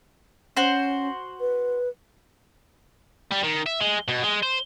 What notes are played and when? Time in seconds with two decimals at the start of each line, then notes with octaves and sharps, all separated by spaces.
0.57 C#4 F#4 C5
1.40 B4
3.31 G3
3.43 D#3
3.66 E5
3.81 G#3
4.08 B2
4.23 G#3
4.43 C5